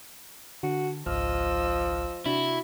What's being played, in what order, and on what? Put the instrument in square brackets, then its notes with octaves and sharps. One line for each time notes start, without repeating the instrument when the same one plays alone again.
[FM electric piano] D3 [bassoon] F#4
[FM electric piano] G#1 C#2 F6 [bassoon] F3 [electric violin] D#5 E6
[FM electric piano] C3 D4 [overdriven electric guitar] E4 [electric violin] F#4